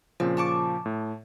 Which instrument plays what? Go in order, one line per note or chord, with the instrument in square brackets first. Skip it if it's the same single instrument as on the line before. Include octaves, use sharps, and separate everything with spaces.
[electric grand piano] A#2 C#3 F3 [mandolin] C4
[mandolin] A5 C#6 D6
[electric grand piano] A2